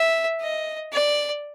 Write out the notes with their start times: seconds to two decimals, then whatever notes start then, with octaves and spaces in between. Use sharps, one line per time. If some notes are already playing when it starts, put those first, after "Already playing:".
Already playing: E5
0.41 D#5
0.93 D5